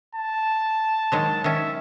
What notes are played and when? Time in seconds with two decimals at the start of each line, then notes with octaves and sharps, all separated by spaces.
0.15 A5
1.12 D#3 F#3 G#3
1.44 D#3 C#4 E5